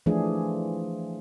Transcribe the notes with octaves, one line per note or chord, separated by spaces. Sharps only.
E3 F3 A3 D4 G#4